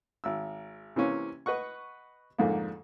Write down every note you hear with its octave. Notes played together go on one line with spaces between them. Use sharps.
G#1 E6
C3 E3 A#3 C#4
B4 D#5 F#5 C#6
F2 G#2 D3 A3 A#3